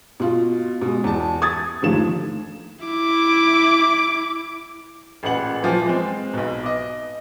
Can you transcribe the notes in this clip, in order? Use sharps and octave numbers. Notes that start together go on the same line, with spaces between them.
B2 F4
B2 G#3
E2 A5
D#6 G#6 A6
G1 D#2 F3 A3 E7
E4 D6
A1 A#2 G#4 B4 F#5 F#7
A#2 E3 F3
G#3 C4
B1 B2
D#5 D6